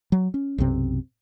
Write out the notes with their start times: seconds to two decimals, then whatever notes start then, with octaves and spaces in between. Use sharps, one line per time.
0.12 F#3
0.34 C#4
0.58 B1 F#2 C3 C4